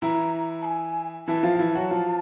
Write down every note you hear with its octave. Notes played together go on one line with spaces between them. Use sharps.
E3 E4 A#5
A5
G#5
E3 E4 A5
F3 F4
F4
E3 E4
F#3 F#4
F3 F4